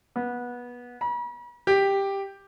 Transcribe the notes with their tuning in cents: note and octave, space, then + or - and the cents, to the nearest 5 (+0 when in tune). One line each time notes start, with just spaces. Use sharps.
B3 -20
B5 -45
G4 +5